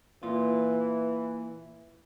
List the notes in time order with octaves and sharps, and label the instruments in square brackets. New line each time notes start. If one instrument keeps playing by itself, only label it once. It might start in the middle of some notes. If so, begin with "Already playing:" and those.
[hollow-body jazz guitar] A#2 F4 [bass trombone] E3